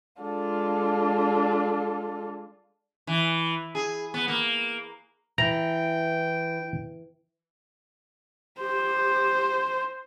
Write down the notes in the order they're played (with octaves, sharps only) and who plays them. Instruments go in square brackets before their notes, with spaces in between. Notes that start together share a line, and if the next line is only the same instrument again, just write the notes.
[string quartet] G#3 D4 F4 A4
[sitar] E3
G#4
B3
A#3
[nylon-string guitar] E3 [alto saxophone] G5 [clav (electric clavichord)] A#5
[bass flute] G4 [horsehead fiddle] C5